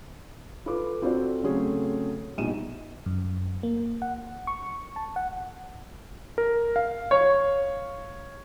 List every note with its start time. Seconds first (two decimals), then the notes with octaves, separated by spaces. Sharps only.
0.66 F4 A4 B4 D6
1.02 C4 F4 F#4 A4 C5 D5
1.43 C#3 F#3 A3 C4 C#4 G#4
2.38 A#1 B2 G3 D#4 D#7 E7
3.06 F#2
3.63 A#3
4.02 F#5
4.47 C#6
4.96 A5
5.16 F#5
6.38 A#4
6.76 F5
7.11 C#5